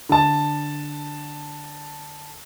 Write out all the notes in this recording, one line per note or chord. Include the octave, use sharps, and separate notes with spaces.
D3 A5